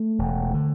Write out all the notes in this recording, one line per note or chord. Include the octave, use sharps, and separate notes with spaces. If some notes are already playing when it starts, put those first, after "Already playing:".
Already playing: A3
E1
D3